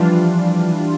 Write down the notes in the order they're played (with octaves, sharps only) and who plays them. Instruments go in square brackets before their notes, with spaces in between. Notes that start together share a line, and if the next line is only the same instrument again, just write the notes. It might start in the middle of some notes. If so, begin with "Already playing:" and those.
Already playing: [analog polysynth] E3 G3 D4 F4 [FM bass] F3